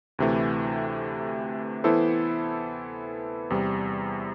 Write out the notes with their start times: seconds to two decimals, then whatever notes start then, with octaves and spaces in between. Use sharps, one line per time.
0.19 D2 C3 E3 A3
1.84 E3 B3 E4 A4 C5
3.50 E2 C3 G3